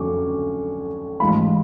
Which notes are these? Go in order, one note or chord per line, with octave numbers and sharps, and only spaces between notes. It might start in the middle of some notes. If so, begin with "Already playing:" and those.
Already playing: F2 D3 F#3 C#4 C#6 D6
A1 G#2 F3 B5